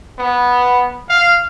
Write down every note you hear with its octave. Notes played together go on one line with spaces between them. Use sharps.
B3
F5